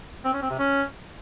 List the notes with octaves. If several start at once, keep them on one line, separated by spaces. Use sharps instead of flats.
C4
C#4
C4
C3
C#4